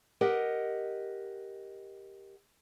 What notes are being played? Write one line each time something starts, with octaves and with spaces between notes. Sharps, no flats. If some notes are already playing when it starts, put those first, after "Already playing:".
G4 A#4 D#5 F#5